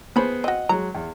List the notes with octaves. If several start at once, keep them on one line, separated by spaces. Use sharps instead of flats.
F3 B3 G#4 C5 C#5 B5
C4 F#4 D#5 F#5
F#3 G#3 A#5
E2